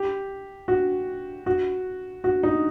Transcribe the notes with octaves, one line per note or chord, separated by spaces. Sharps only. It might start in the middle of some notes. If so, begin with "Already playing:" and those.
Already playing: G4
F#4
F#4
F#4
D#4